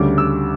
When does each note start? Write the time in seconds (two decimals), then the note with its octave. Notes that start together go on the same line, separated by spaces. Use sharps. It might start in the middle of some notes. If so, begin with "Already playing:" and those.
Already playing: D2 C#3 G3 D6
0.18 E6